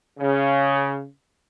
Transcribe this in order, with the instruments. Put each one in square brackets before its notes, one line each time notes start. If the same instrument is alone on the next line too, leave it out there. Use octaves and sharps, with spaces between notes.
[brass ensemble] C#3